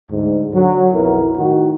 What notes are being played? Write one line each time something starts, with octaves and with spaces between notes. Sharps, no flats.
D2 G#2
D3 F#3
B1 F2 B3 E4 A#4
A2 D#3 F#4